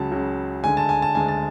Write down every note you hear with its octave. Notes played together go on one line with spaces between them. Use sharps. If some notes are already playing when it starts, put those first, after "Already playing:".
Already playing: C#2 C#3 F#3 A5
C#2 C#3 F#3
D2 D3 G#3 G#5
A5
G#5
A5
D2 D3 G#3 G#5
A5